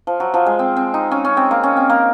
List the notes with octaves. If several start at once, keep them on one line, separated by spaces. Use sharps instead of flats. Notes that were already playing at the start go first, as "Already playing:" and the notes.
F3
F#3
F3
G#3
C4
C4
D#4
C#4
C#4
C4
A#3
C#4
C4
A#3